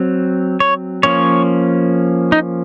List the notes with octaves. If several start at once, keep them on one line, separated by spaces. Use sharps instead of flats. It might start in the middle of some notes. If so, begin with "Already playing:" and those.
Already playing: F#3 C4
C#5
F3 A#3 C#4 C#5
D#4